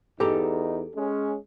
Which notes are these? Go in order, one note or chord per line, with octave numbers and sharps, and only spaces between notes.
E2 D#4 G4 A4 A#5
G#3 C#4